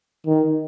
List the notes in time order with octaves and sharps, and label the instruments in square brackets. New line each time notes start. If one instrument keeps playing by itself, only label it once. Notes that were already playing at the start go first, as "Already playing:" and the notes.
[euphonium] D#3